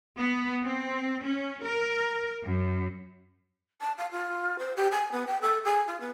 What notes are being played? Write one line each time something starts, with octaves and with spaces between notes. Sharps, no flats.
B3
C4
C#4
A#4
F#2
A5
F5
F4
C5
G4
G#5
B3
G5
A4
G#4
F4
B3